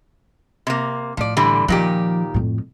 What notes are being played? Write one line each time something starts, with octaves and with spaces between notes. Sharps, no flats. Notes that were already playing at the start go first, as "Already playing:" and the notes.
C3 A#3
A2 F3 D5
D3 E3 G3
A#2 D#3 F3 G4
F2 A2